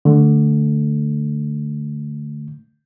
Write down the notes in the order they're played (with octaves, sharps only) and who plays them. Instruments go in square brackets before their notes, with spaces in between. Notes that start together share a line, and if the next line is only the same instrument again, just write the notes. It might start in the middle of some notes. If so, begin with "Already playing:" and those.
[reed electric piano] D3 A3